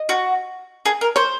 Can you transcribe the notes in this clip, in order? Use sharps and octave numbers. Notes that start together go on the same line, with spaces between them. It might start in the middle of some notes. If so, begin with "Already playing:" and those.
Already playing: D#5
F#4
G#4
A#4
C5 C#5